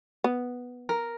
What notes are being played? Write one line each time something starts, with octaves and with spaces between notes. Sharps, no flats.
B3
A#4